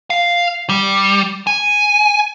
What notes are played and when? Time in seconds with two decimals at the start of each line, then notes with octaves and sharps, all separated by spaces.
0.10 F5
0.69 G3
1.47 G#5